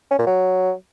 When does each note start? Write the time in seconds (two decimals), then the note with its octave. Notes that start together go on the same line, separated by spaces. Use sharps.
0.11 C#4
0.19 A#2
0.27 F#3